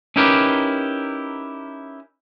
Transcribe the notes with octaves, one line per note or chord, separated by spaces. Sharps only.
C#4 D#4 E4 G4 A#4 B4